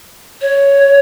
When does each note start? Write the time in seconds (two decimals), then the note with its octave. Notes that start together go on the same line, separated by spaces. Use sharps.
0.41 C#5